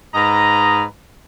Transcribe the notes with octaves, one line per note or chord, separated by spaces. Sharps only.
G#2 B4 D#5 A#5